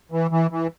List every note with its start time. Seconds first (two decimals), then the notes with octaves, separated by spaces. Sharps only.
0.12 E3
0.31 E3
0.51 E3